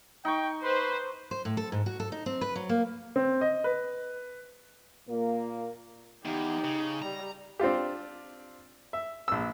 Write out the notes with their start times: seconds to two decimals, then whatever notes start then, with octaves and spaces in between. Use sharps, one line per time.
0.25 D#4 G5 C#6
0.64 B4 C5
1.31 C5
1.45 A2
1.57 A4
1.72 G#2
1.86 F#4
2.00 A4
2.12 D#4
2.26 C4
2.41 B4
2.55 F#3
2.69 A#3
3.16 C4
3.41 D#5
3.64 B4
5.08 A#2 A#3
6.25 E2 D#4 G4
6.64 C#3
7.02 G3 A#5
7.59 C4 D4 F4 G4
8.93 E5
9.28 A#1 E6